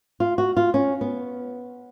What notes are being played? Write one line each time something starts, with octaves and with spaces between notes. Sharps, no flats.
F4
F#4
F4
C#4
B3